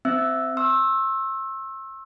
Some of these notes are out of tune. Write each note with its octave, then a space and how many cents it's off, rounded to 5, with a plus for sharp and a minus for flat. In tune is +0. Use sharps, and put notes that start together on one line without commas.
C4 -20 E5 +5 E6 +0
C6 +45 E6 +0